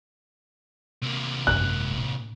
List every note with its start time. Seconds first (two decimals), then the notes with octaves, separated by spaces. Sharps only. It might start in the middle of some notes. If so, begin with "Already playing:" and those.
1.02 C3 A#3
1.47 G#1 F#2 F#6
1.97 A2 D4